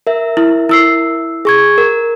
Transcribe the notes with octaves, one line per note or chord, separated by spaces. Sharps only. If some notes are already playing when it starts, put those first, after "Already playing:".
A#4 E5
E4
E4 E6 C7
G#4 C#6 G#6
A#4